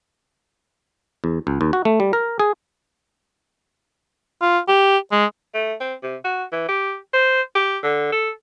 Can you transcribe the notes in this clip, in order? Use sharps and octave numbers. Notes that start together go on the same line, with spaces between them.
E2
C#2
D#2
F#4
A3
G3
A#4
G#4
F4
G4
G#3
A3
C4
C3
F#4
E3
G4
C5
G4
D3
A4